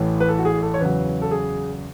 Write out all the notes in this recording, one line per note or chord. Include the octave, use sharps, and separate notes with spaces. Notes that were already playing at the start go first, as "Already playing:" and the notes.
Already playing: A1 A2 E3
B4
A4
F#4
G#4
A4
C#5
E2 C#3 F#3 B4
A4
G#4